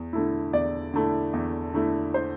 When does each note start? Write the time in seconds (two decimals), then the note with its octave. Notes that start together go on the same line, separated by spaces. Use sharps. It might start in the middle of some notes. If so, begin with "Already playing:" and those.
Already playing: E2
0.13 D3 A3 E4
0.53 E2 D5
0.94 D3 A3 E4
1.33 E2
1.74 D3 A3 E4
2.14 C5